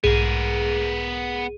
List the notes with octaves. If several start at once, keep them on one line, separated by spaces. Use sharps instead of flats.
B1 G#2 B3 G#4 A#4 C7 D#7